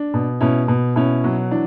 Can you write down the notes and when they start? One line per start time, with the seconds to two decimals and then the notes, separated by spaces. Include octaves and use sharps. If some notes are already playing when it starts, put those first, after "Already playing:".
Already playing: D4
0.14 B2
0.40 B2 C#4 E4
0.68 B2
0.96 B2 C#4 E4
1.24 F#3
1.51 E3 D4